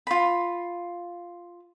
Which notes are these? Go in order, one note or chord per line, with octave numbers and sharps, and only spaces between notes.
F4 B5